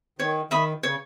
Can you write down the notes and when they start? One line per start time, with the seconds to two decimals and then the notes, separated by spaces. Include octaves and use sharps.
0.19 D#3 C#5
0.51 D#3 E5 B5 D#6
0.83 C#3 C#5